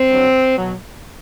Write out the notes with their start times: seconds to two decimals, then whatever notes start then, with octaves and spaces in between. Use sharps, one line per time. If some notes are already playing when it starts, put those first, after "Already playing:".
Already playing: C4
0.10 G2 D3 F#3
0.57 B2 F#3